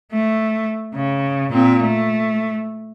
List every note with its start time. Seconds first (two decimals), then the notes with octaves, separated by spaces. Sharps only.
0.12 A3
0.95 C#3
1.52 A#2 C4
1.83 A3